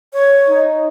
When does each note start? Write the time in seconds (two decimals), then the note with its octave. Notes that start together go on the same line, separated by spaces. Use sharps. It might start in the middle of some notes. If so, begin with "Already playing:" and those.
0.13 C#5
0.48 D#4